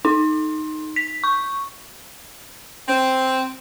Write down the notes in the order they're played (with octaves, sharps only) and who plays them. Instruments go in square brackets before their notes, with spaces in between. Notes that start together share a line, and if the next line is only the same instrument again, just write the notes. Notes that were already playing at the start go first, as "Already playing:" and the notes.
[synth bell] D#4
B6
C#6
[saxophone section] C4